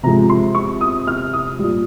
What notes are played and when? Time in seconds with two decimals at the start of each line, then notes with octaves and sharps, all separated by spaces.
0.03 C3 F3 G#3 A#5
0.30 C6
0.55 C#6
0.81 D#6
1.07 F6
1.33 D#6
1.59 A#2 G3